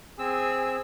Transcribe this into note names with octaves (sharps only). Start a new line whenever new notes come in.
C4 G#4 E6